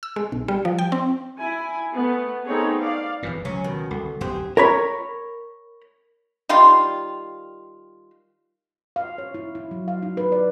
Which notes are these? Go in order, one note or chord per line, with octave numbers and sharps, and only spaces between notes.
E6
G#3
B1
G3
F3
G5
C4
E4 G#5
A3 B3
A3 B3 C4 D#4 G#4 C#5
D5 F5
F1 E2 A2 E3
C#2 C3 F#3 C#4
B2 D#3
C2 D3
D1 B1 F#2 G4 G#4 C5
A#4 C#5 B5
D#3 G3 F4 C6
F5
C#5
E4
E4
F#3
F5
D#4
B4
D5